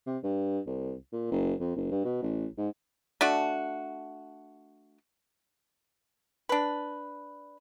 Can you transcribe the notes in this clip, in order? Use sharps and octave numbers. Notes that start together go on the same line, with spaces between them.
C3
G2
C2
A#2
F#1
F2
F#1
G2
B2
A1
G#2
A3 D4 F#4
D4 B4